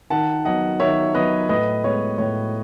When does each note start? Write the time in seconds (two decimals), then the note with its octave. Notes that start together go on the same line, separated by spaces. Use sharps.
0.10 D#3 F#5 A5
0.45 F#3 B3 D#5 F#5
0.80 D#3 C#5 E5
1.15 F#3 B3 B4 D#5
1.49 A2 B4 D#5
1.84 G#3 B3 C#5
2.18 A2 C#5